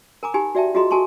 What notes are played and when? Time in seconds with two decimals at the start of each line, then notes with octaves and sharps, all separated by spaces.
0.23 A#4 G#5 A#5 D6
0.34 D#4 G4 G#5 B5
0.55 F#4 D5 E5 G5 A5
0.74 F4 F#4 G#4 D#5 A#5 C6
0.91 F#4 A4 G#5 A5 C6 C#6